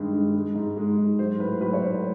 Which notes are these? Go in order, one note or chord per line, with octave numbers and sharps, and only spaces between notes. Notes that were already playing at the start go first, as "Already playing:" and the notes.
Already playing: G2 D#3 G#3
G#3
G#3
G#2
G#3
G#2
F#3 C5
A2 B4
F#3 B4
C#5
A2 C5